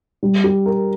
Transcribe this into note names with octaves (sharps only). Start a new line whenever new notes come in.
G3
G4
A#4